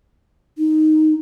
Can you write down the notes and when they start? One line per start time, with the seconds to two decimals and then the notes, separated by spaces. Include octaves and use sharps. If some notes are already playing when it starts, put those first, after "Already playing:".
0.58 D#4